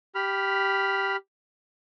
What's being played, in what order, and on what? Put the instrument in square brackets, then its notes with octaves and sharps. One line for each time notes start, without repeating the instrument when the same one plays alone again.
[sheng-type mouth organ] G4 B5 F6